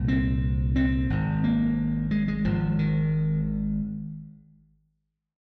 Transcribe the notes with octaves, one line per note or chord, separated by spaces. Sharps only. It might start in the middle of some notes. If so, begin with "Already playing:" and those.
Already playing: C2 A#2
C4
C4
G#1 G#2
A#3
G#3
G#3
G#1 G#2 F3
D#3